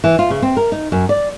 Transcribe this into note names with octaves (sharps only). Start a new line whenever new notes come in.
E3
F4
C#3
C4
A#4
D#4
F#2
D5